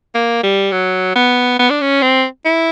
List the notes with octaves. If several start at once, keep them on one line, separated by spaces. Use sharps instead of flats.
A#3
G3
F#3
B3
B3
D4
C#4
C4
E4